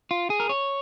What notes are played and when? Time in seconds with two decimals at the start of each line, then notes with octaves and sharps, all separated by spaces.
0.11 F4
0.30 G#4
0.40 A#4
0.49 C#5